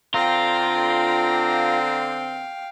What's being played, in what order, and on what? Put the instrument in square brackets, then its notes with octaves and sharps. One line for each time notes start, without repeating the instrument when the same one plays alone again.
[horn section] D3 C4 [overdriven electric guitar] F4 [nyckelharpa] F5 G5 [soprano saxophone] A#5